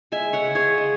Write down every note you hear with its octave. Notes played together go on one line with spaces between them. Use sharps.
G#3 E5 G#5
C#5 F#5
C#3
G#4 C#5
G#3